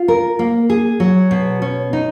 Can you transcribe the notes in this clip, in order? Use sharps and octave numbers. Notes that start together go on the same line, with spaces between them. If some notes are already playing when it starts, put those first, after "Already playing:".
Already playing: F4
A#4
A#3
G#4
F#3
B2
C#4
D#4